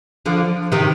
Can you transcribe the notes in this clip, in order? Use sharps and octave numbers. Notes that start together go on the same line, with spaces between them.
D3 F3
C3 D#3